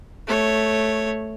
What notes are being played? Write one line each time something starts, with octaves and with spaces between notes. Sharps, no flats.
A3 C#5